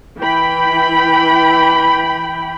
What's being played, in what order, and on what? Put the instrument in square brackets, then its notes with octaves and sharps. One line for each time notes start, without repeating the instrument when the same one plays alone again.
[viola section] E3 G5 B5